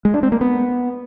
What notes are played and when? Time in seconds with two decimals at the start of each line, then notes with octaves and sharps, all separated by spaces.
0.05 G#3
0.14 D4
0.23 C4
0.32 A#3
0.41 B3